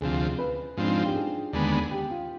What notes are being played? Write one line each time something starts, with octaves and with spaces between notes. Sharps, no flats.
D2 C3 F3 G#4
B4
G#2 F3 C4 D4
D#4
F4
G4
G#4
D#2 D3 G#3 B3
G4
F4